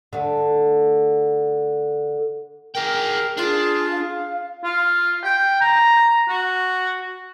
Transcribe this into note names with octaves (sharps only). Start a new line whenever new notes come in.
D3 A3
G#4 A#4 G5
D4 F4 G#4
F5
F4
G5
A#5
F#4